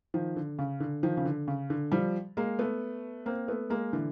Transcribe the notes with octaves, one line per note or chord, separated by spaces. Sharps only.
D#3 F3
D3
C#3
D3
D#3 F3
C#3
D3
C#3
D3
F3 G3
G#3 A#3
A3 B3
A#3 C4
A3 B3
G#3 A#3
D3 E3